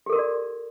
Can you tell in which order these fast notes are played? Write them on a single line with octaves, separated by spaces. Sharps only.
G4 A4 A#4 F#4 D5